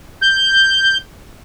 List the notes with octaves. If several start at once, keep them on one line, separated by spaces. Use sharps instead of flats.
G6